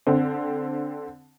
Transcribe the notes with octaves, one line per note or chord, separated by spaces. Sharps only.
D3 C4